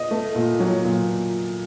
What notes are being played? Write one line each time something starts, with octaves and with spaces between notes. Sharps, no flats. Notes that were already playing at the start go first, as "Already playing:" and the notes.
Already playing: D#5
A3
A#2
F#3
A#2